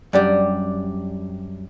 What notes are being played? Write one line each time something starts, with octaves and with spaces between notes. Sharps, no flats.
F#2 G3 D4 G4 D5